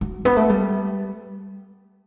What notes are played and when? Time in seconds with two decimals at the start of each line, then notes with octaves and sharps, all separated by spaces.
0.01 F#3
0.25 B3
0.36 A3
0.49 G3